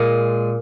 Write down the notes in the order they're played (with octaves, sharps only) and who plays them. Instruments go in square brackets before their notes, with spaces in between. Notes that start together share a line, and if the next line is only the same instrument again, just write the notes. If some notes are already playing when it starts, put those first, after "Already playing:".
Already playing: [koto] A#2 G#3